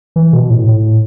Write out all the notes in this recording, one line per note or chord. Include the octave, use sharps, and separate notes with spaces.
E3
B2
A2
A2